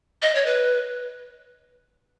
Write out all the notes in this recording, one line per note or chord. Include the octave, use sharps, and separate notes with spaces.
D#5
C#5
B4